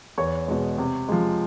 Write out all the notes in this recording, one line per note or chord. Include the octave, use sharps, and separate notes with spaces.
E2 C#5 C#6
B2 G#3
C3
F3 G#3